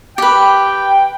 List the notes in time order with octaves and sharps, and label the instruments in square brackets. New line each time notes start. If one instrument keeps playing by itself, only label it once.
[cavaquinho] G4 B4 [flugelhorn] G5